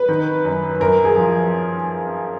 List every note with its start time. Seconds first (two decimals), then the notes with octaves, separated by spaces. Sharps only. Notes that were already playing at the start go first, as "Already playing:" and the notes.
Already playing: B4
0.09 D#3
0.45 F#2
0.80 F#2 A#4
1.05 G#4
1.16 F3